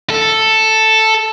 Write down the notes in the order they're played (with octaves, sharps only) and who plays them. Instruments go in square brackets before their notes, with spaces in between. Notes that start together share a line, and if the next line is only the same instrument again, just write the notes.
[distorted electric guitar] A4